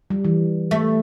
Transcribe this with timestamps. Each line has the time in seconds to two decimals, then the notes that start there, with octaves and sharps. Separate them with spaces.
0.10 G3
0.25 E3
0.71 A3